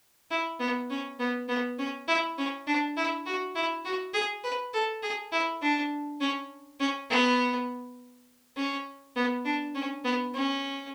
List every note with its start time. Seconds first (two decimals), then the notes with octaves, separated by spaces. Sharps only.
0.31 E4
0.60 B3
0.90 C#4
1.19 B3
1.48 B3
1.78 C#4
2.08 E4
2.38 C#4
2.67 D4
2.97 E4
3.26 F#4
3.55 E4
3.85 F#4
4.14 G#4
4.44 B4
4.74 A4
5.03 G#4
5.32 E4
5.62 D4
6.20 C#4
6.80 C#4
7.10 B3
8.57 C#4
9.16 B3
9.45 D4
9.75 C#4
10.05 B3
10.34 C#4